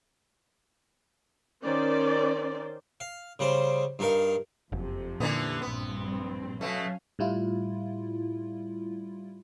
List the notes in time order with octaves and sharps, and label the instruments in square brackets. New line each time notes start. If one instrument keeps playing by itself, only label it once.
[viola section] D#3 C#4 C5 D5
[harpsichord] F5
C#3 G3 C5
G2 D#4 A#4 F5
[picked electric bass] F#1 [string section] F2 C3
[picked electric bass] A#2 [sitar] D3 E3 B3
[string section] A#1 G2 C4 [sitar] B3
[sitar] B2 A3 [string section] F#3 C#4 F5
[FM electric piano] A2 G3 E4 F4